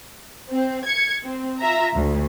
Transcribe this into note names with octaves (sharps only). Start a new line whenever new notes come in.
C4
G#6 C#7
C4
F4 E5 A#5
D2